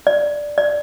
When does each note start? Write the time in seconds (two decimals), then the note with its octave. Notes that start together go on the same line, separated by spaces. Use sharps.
0.07 D5
0.58 D5